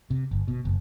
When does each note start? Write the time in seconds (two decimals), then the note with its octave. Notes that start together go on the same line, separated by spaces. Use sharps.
0.10 C3
0.31 G1
0.48 B2
0.65 F#1